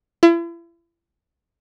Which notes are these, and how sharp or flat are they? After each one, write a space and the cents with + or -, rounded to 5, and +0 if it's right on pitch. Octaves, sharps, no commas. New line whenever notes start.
E4 +40